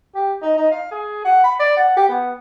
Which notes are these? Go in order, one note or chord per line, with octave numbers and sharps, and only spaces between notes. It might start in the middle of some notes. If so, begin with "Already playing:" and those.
G4
D#4
D#4
F5
G#4
F#5
B5
D5
F#5
G4
B3